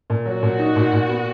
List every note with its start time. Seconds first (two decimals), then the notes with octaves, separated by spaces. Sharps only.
0.10 A#2
0.26 F#3 F#4
0.43 A#2
0.59 D#4
0.76 A#2
0.93 A#2
1.09 B3